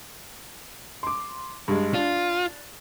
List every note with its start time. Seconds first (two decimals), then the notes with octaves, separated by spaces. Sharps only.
1.03 C6 D6
1.68 G2 G#3
1.94 D4 F4